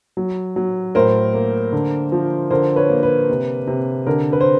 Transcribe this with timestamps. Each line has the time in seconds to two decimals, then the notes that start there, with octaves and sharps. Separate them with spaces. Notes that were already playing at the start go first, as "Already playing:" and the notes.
0.17 F#3
0.56 F#3
0.95 A2 A#4 C5
1.34 A#3
1.72 D3
2.12 F3
2.50 D3 A#4 C5
2.76 B4 C#5
2.89 A#3
3.03 B4
3.29 C3
3.67 C3
4.07 D3 A#4
4.33 B4
4.41 C5